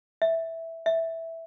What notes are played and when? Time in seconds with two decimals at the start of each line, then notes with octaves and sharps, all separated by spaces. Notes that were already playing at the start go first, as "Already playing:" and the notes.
0.22 E5
0.86 E5